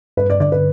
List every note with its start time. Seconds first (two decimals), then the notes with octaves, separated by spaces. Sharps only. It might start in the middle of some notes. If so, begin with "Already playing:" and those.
0.17 G2 B4
0.30 D5
0.40 D3 D5
0.52 B4